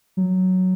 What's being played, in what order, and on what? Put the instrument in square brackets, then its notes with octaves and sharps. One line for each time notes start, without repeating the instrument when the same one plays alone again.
[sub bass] F#3